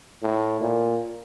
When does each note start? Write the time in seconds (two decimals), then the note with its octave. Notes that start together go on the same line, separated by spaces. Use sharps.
0.22 A2
0.61 A#2